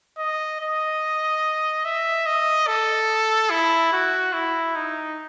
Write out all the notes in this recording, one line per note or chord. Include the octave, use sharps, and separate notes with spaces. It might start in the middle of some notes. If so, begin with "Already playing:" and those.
D#5
D#5
E5
D#5
A4
E4
F#4
E4
D#4